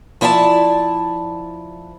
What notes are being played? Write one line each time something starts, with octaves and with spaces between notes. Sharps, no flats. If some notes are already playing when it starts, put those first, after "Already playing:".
F3 E4 D5 G5 A5